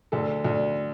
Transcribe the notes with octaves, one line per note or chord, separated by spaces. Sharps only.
D2 A4
D2